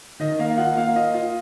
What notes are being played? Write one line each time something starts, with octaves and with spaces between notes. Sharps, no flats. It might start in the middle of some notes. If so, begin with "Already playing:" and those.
D#3 D#5
A#3 F5
F4 F#5
A#3 F5
F4 D#5
F4